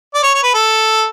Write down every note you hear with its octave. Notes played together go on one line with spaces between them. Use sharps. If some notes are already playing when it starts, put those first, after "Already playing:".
D5
C#5
C#5
B4
A4